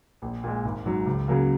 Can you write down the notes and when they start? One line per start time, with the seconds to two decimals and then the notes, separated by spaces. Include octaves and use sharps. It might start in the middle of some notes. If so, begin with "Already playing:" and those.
0.22 A#1
0.44 A#2 G#3
0.65 G#1
0.85 G#2 F#3
1.06 C#2
1.28 C#3 F#3 A#3